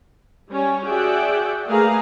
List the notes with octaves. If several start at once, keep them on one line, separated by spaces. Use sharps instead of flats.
G3 C#4 C#5
F#4 G#4 D5 E5 F#5 G5
A3 A#3 G#4 B4 F5 A#5